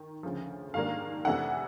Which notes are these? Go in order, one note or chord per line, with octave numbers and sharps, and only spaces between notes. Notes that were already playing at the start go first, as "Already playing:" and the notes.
Already playing: D#3
D2 C#3 F3
G#2 D#3 G3 A#3 D4 F5
F2 C3 E3 A3 D4 F#5